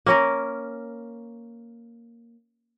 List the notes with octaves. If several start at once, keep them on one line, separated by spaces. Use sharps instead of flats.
A#3 C#4 A#4